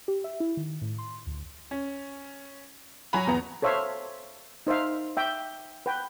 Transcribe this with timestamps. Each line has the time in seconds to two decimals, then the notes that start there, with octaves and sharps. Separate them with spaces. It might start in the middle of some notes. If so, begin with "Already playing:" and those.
0.08 G4
0.24 E5
0.40 E4
0.57 D#3
0.81 A2
0.98 C6
1.26 D2
1.71 C#4
3.13 F#3 F#4 G#5 A#5 B5
3.27 E2 B3 A#5
3.62 A4 C5 C#5 E5 F5
4.67 D#4 C5 E5 F5
5.17 E5 G5
5.86 B4 G5